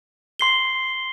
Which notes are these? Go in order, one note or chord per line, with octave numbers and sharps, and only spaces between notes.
C6 C7 G7